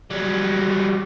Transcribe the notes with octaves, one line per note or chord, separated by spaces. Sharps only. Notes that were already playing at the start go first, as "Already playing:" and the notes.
F#3 G3